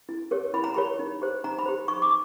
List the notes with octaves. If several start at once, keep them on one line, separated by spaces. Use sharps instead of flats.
E4
G4 A#4 C#5
E4 B5
A#5
G4 A#4 C#5 B5
D#4
G4 C5
D#4 A#5
B5
G4 C5
D#4 C#6
D6